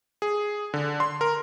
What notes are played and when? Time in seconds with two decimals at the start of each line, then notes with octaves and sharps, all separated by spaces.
0.22 G#4
0.74 D3
1.00 C6
1.21 A#4